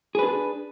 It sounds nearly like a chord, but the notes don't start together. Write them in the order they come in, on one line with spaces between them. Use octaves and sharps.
G#4 B4 D4